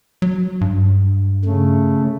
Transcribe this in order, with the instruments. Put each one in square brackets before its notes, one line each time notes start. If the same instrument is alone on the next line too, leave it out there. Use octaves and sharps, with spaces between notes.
[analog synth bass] F#3
G2
[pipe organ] C#3 A3